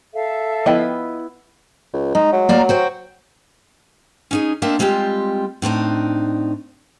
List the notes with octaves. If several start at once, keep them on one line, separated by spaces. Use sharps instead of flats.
A4 E5 F5
F3 B3 E4 D#5 G5 B5
C#2
G#3 D#4
F#3
A#3 D5 A#5
F#4 C5 G5
C#4 D#4 G#4
A#3 C4 D4 A#4 D#5 E5
G3 G#3 C4 F4 G4
A2 C4 D4 D#4